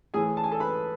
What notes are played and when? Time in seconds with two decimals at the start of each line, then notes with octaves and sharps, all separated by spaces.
0.14 A2 E3 A3 G#4 G#5
0.37 A5
0.44 G#5
0.52 A4 A5
0.60 B4 B5